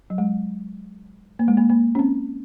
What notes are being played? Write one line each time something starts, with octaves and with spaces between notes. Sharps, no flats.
F#3
G#3
A#3
G#3
A#3
A#3
C#4
C4